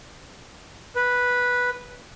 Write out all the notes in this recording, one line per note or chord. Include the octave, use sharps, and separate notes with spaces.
B4